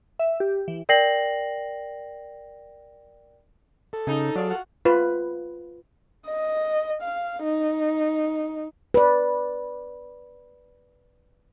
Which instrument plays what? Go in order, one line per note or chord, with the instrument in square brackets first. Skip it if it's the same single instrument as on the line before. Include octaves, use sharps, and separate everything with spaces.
[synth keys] E5
G4
E3
[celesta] A#4 D5 G5 A#6 C7 F#7
[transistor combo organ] A4
[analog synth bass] C#3 [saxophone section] D#4
[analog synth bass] F#3 [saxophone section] F4 G#4 D5
[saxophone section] F4 F#4 F#5
[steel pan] F4 B4
[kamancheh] D#5
F5
D#4
[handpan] B4 D5